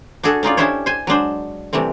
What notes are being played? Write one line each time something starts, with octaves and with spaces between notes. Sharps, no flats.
D4 F#4 G#4 A4
C#4 D#4 F4 D5
C#4 D4 E4 G4 C5 C#5
C5 G#5
F#3 G#3 D4 C5
C3 E3 G3 A3 C4